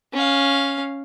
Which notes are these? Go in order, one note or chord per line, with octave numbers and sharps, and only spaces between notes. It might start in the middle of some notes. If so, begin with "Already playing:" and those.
C#4 F5